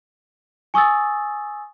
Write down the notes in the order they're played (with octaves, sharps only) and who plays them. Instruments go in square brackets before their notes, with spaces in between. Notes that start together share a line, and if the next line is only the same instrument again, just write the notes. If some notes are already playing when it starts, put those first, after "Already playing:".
[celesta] G#5 C#6 D#6 E6 A6